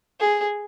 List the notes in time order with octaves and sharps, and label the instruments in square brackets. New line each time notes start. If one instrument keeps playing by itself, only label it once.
[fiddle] G#4